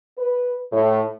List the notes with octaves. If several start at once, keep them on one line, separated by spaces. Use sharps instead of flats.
B4
A2